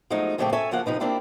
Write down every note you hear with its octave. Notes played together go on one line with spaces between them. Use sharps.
F3 F#3 G#3 A3 D#4
A#2 C#3 F3 A3 C4 G4
A4 C#5 E5 G#5
C#3 F3 A#3 F5 F#5
C3 F3 D#4 B4
A#3 C4 D4 E4 F4 G4